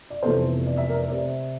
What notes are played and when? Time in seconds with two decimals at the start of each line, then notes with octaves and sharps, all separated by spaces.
0.10 D5
0.23 F1 E2 C3 A4 C5
0.67 D5
0.77 E5
0.89 A#4 D5
1.10 C3 D5